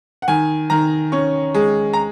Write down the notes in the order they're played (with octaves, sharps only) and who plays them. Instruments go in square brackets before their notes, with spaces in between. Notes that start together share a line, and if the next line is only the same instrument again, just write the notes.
[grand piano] F#5
D#3 G#5
D#3 A#5
C#4 C#6
G#3
A#5